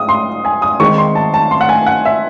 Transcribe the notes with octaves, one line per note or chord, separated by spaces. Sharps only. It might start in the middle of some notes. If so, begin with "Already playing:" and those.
Already playing: G#2 D#6
C6
G#5
D#6
D#3 G#3 C4 D#4 C#6
C6
A5
A5
C6
F#5
G#5
F#5
E5